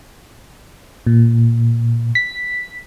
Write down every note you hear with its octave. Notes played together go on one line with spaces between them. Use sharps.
A#2
B6